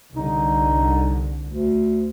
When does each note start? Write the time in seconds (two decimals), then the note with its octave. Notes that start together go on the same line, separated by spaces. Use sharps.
0.16 C2 D3 D#4
1.47 D2